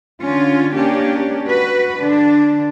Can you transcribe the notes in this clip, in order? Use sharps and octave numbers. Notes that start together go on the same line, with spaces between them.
D3 C#4 F4
A#3 C#4 D4 G4
F#4 B4
D3 D4